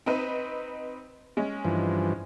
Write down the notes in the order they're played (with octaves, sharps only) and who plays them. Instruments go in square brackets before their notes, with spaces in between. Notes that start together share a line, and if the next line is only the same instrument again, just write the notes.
[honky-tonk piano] C4 D#4 B4
G#3 C#4
[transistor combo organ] G2 E3 F3